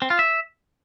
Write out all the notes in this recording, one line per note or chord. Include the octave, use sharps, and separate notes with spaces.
C4
F4
E5